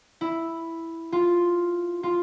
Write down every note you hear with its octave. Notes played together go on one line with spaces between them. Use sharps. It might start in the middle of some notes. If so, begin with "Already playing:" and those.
E4
F4
F4